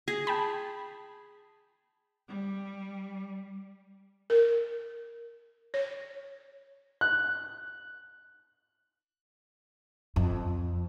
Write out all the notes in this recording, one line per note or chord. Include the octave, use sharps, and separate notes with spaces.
G#4
G5 A5 B5
G3
A#4
C#5
F#6
F2